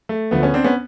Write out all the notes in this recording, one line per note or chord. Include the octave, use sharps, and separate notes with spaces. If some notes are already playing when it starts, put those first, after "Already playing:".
A3
D2 D3 F3 A3 B3
B3 C#4
C4 D4
B3 C#4